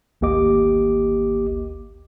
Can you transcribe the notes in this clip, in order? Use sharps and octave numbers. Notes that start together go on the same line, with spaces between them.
G#1 D2 A#3 G4 D#5 D6